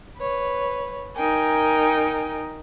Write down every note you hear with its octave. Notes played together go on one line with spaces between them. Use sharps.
B4 C#5
D#4 A#4 G5 G#5